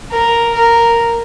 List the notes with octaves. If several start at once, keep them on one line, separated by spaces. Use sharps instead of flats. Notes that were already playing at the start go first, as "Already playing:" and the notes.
A#4
A#4